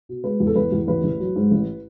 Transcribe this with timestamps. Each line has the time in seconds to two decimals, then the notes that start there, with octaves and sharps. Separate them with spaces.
0.09 B2
0.24 G#3 B4
0.40 E2
0.47 A4
0.55 E2 B4
0.72 E2
0.88 A1 B4
1.04 A1
1.20 F#3
1.36 G#2
1.51 A1